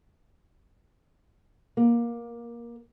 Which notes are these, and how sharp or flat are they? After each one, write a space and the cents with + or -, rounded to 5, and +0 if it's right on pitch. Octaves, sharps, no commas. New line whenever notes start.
A#3 +15